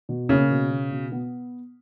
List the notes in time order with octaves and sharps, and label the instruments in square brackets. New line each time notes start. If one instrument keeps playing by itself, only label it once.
[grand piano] B2
[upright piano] C#3 [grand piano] A#3
[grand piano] B2
B2
B2
B3